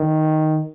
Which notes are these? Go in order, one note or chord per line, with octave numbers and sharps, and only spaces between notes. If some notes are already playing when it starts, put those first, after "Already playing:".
Already playing: D#3